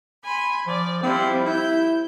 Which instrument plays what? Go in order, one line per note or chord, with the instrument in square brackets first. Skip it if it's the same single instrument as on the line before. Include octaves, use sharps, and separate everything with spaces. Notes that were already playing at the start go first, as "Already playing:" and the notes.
[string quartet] G#5 B5 C6
[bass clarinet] F3 [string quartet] D5
[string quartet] F3 G3 E4 [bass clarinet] C4
[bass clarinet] E4 [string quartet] G6